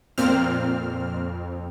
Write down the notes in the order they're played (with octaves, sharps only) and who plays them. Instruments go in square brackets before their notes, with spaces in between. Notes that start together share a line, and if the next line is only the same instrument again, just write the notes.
[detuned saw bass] F2 [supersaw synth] A#2 C4 F6